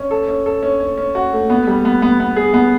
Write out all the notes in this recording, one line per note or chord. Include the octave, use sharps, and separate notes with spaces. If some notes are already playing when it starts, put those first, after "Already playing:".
Already playing: C#4
A4
C#4
A4
C#4
C#4
C#4
F#4
A3
B3
G3
B3
B3
B3
G#4
B3